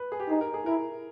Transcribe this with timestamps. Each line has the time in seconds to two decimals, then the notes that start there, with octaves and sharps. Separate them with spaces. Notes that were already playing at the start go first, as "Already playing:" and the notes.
Already playing: B4
0.12 G#4
0.20 G4
0.29 D#4 G#4
0.41 A#4
0.54 G#4
0.66 E4 A#4